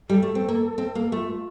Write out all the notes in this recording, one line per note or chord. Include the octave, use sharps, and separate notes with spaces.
G3 A4
A3
C4
A#3
C4
A#3
A3 F4